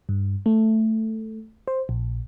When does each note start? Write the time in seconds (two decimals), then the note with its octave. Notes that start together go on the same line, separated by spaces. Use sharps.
0.09 G2
0.46 A3
1.68 C5
1.89 A#1